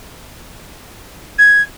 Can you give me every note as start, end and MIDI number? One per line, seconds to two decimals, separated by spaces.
1.39 1.62 92